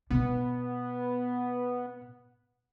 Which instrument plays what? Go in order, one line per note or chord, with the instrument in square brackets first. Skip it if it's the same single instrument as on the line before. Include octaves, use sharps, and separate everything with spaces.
[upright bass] B2 [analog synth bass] B3